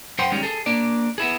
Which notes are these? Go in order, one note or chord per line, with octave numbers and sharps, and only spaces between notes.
F#2 C5 F#5 G5 C6
D#3 G3 G#3 C#4
G#4 A4
A#3 D4 D5
B3 E4 G#4